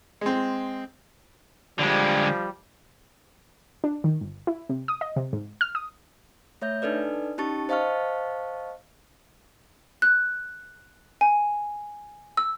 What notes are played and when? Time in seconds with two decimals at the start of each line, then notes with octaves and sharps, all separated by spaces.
0.21 G#3 C4
1.79 D3 F3 G3 G#3
3.84 D4
4.04 D#3
4.21 G1
4.47 E4
4.69 C3
4.88 D#6
5.01 D#5
5.16 C3
5.33 G#2
5.61 F6
5.75 D#6
6.62 A3 C#5 E5 G6
6.82 D4 D#4 A4 B4 D5
7.38 C#4 D#4 G4 A5 C#6 A6
7.69 C5 D#5 F5 A5 C#6 F6
10.02 F#6
11.21 G#5
12.37 E6